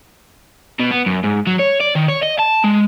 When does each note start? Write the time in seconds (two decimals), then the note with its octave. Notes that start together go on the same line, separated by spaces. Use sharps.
0.80 B2
0.91 B3
1.06 F#2
1.24 G#2
1.47 F#3
1.59 C#5
1.80 D5
1.95 D#3
2.08 C#5
2.22 D#5
2.39 A5
2.64 G#3